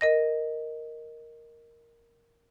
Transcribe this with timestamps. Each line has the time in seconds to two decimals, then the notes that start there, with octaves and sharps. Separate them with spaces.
0.01 A#4 D#5 A#6